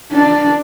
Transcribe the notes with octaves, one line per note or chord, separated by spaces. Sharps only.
D4